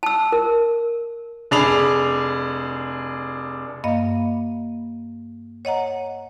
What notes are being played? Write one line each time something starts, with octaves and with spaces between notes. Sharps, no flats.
A5 E6
A#4
F1 D4 G#4 B5 F7
G2 A#3 D#5 F5
C#5 D#5 F#5 A#5